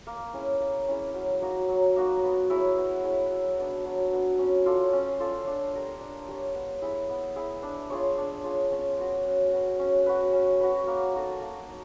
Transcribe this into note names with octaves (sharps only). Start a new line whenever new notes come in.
A#3
C#4 E4 G#4
A#3
C#4 E4 G#4
F#3
A#3 D#4 F#4
F#3
A#3 D#4 F#4
B3
E4 G#4 C#5
B3
E4 G#4 C#5
F#3
B3 D4
F#3
B3 D4
C#4
F4 A4 D5
C#4
F4 A4 D5
D4
G4 A#4 C#5
D4
G4 A#4 C#5
B3
E4 G#4
B3
E4 G#4
D4
F4 G#4 C#5
D4
F4 G#4 C#5
C#4
F#4 B4
C#4
F#4 B4
C#4
F#4 B4
C#4
F#4 B4
A#3
D#4 F#4 A4
A#3
D#4